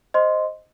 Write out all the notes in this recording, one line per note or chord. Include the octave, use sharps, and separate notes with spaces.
C5 D#5 C6